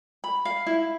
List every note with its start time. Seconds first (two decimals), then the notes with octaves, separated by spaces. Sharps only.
0.24 B5
0.45 F5
0.66 E4